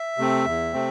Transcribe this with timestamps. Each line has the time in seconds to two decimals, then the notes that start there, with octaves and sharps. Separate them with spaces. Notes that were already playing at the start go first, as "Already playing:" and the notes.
Already playing: E5
0.18 C3 A3 C4
0.45 E2
0.73 C3 A3 C4